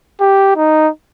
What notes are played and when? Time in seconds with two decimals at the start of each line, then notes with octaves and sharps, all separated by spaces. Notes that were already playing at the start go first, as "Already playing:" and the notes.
0.21 G4
0.57 D#4